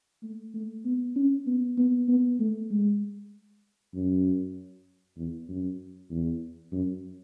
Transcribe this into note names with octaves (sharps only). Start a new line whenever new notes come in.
A3
A3
B3
C#4
B3
B3
B3
A3
G#3
F#2
E2
F#2
E2
F#2